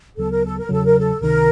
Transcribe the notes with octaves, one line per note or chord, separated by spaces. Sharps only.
D2 C#3 F#3 B3 A4
A#4
A4
A#4
E2 C#3 F#3 A4
A#4
A4
C#2 C3 D#3 A#4